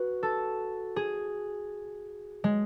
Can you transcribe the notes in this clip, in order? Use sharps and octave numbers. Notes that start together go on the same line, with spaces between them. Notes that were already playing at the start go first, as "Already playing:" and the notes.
Already playing: F#4 B4
A4
G#4
G#3